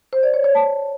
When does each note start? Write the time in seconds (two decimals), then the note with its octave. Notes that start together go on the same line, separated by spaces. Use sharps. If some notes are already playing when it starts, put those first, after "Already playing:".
0.13 C5
0.23 D5
0.34 C#5
0.44 C#5
0.55 A5